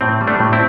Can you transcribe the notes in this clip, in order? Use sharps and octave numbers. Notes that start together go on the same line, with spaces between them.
A2 C4
G3
A3 D4
A2
C4 E4